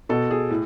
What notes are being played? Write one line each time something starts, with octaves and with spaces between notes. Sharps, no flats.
B2 A4
G#4
A2